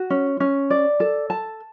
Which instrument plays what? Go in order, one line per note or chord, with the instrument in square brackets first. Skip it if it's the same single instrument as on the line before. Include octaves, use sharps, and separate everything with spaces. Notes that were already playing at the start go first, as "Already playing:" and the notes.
Already playing: [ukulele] F#4
C#4
C#4
D5
A4
A5